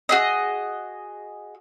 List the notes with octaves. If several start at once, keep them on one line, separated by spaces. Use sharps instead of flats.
F#4 G#4 D#5